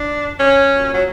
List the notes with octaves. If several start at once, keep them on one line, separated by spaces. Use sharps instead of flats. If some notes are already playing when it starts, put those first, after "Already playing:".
Already playing: D4
C#4
A#2 F#3
F#3